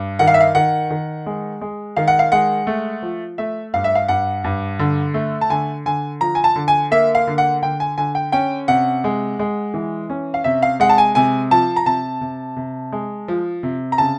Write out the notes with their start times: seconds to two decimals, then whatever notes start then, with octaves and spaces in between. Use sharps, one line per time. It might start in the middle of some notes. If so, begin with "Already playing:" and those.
Already playing: G2
0.19 D#3 F#5
0.27 F5
0.34 E5
0.41 F5
0.55 D#3 F#5
0.90 D#3
1.26 G#3
1.61 G#3
1.96 D#3 F5
2.08 F#5
2.19 F5
2.32 G#3 F#5
2.67 A3
3.02 F3
3.38 A3 E5
3.74 G2 F5
3.84 E5
3.95 F5
4.08 G2 F#5
4.44 G2
4.79 D3
5.14 A3
5.41 A5
5.50 D3 G#5
5.86 D3 G#5
6.21 F3 A#5
6.35 G#5
6.44 A5
6.56 D3
6.68 G#5
6.91 A#3 E5
7.15 F5
7.27 D3
7.38 F#5
7.62 D3 G5
7.80 G#5
7.98 D3 G#5
8.15 G5
8.32 C#4 G5
8.68 C3 F#5
9.04 G#3
9.39 G#3
9.74 E3
10.10 C#4
10.34 F5
10.44 C3 E5
10.62 F5
10.80 G#3 F#5
10.89 A5
10.98 G#5
11.15 C3 G#5
11.51 F3 A5
11.76 A#5
11.86 C3 A5
12.21 C3
12.56 C3
12.92 G#3
13.28 F3
13.63 C3
13.92 A#5
13.98 C#3 A5